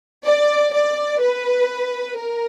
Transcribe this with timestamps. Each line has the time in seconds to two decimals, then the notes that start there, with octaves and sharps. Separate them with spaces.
0.24 D5
0.73 D5
1.21 B4
2.17 A#4